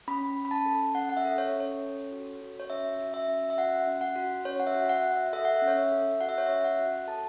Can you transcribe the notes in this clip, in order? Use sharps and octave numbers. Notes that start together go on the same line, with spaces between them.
C#4 B5
C#4
B5
A5
A4
C#4 F#5
F#5
E5
A4
C#5
C#4
C#5
A4
F#4
F#4
C#5
C#4 E5
F#4
E5
C#4
E5
F#4 F#5
C#4
F#5
F#4
C#4 C#5
F#5
E5
F#4
F#5
F#4
E5
A4 E5
F#5
E5
C#4
C#5
E5
A4
F#4 F#5
E5
C#5
C#4 E5
F#5
F#4
A4 A5